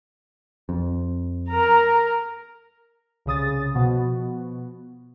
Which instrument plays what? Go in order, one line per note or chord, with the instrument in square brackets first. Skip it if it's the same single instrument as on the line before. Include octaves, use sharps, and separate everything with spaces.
[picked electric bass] F2
[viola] A#4 A#5
[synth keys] C2 C#3 D#6 A6
B2 F3 B3 F#4